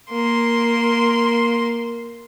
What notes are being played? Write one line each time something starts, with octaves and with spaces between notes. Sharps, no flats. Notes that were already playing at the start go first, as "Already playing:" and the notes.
A#3 C6